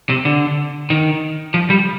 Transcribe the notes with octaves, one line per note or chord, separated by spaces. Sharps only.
C3
D3
D#3
F3
G3